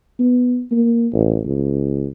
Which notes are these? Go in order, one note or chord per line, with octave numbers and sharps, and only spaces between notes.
B3
A#3
A1
C#2